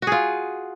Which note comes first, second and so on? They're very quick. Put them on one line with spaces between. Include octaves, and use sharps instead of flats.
F#4 G#4 F4